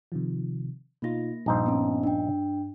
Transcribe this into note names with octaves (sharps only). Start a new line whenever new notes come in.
C3 D#3 F3
B2 A#3 D#4 F4 A#6
A#1 G2 D#4 C5
B3 C#4
D4 G5